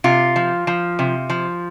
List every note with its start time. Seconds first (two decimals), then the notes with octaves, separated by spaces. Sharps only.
0.04 C3 F4
0.36 F3
0.67 F3
0.99 C3
1.30 F3